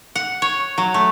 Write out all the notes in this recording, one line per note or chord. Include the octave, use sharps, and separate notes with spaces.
F#5
C#5
F#3
A3